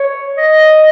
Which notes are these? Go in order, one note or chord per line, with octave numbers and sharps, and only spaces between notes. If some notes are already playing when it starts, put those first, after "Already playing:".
Already playing: C#5
D#5